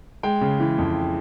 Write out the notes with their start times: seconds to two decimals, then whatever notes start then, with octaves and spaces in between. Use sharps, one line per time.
0.23 G#3 G5
0.41 C#3
0.60 E3
0.78 F2